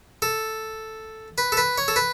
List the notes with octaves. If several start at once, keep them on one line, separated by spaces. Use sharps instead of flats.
A4
B4
A4
B4
C#5
A4
B4